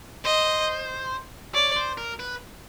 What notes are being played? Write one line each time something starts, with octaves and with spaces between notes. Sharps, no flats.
C5 D#5
C#5 D5
C5
A#4
B4